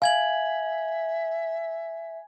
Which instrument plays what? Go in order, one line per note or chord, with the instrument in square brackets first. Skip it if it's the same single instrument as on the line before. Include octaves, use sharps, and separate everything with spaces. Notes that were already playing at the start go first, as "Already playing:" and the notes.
[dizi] E5 [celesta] F5 [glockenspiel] G#5 G#6 F#7